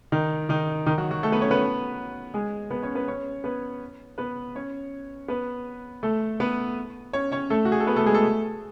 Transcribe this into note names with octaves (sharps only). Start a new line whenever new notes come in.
D#3 D#4
D#3 D#4
D#3 D#4
F#3 F#4
F#3 F#4
A3 A4
B3 B4
C#4 C#5
B3 B4
G#3 G#4
B3 B4
C#4 C#5
B3 B4
C#4 C#5
B3 B4
B3 B4
C#4 C#5
B3 B4
A3 A4
B3 B4
C#4 C#5
C#4 C#5
A3 A4
F#4
G#4
A4
B3 B4
A3 A4
G#3 G#4
A3 A4